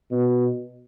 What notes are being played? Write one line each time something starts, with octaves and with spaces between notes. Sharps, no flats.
B2